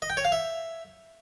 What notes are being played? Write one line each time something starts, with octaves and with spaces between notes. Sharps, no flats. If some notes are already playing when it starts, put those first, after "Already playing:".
D#5
G5
C#5
F5
E5